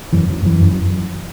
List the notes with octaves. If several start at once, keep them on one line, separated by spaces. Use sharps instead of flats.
F#2 E3
F#2 F#3
F#2 E3
F#2
F#3